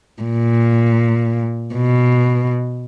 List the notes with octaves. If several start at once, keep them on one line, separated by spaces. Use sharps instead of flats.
A#2
B2